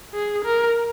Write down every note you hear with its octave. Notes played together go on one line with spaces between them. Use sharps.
G#4
A#4